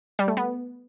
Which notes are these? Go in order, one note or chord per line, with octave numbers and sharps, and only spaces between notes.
G3
A3
B3